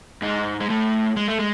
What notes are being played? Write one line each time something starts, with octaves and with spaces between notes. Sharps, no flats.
G#2 G#3
G#3
A2 A3
G#3
A3
G#3